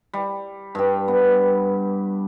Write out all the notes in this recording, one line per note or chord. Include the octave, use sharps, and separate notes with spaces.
G3
G2 G4
B3